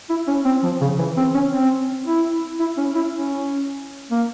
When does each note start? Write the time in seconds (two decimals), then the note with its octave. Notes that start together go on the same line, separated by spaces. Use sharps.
0.10 E4
0.28 C#4
0.45 C4
0.63 F3
0.81 C#3
0.99 E3
1.17 C4
1.34 C#4
1.53 C4
2.06 E4
2.60 E4
2.77 C#4
2.95 E4
3.13 C#4
4.11 A#3